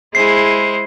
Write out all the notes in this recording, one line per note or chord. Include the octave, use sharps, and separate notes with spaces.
G#3 E4 G#4 C5 C7